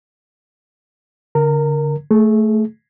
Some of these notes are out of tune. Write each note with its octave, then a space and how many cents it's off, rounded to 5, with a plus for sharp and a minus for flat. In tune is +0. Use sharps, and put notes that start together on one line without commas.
D3 -25 A#4 +0 A#5 -30
A3 +0 G#4 +25